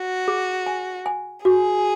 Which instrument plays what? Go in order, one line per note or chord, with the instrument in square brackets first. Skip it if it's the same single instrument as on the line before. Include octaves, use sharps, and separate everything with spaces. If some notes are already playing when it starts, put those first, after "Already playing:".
Already playing: [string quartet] F#4
[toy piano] G#4
G#5
G#5
[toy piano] F#4 [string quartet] G#4